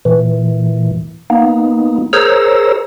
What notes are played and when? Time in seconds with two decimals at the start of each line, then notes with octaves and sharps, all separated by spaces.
0.05 A#2 E3
1.30 A#3 B3 D#4
2.13 G#4 A#4 C5 C#5 A#5 E6